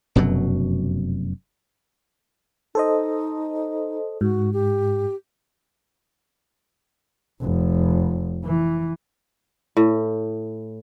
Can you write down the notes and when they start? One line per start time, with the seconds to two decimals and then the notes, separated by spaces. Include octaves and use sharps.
0.15 F1 F#2 B2 F#3
2.75 D#4 A4 C5 D#5
4.21 G#2 F#4
4.53 G4
7.41 F1
8.44 E3
9.77 A2